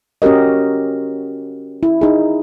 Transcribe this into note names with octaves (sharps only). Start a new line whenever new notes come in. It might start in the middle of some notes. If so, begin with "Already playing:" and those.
C#4 F#4 G4 A#4 D#5
E4
D#4 G#4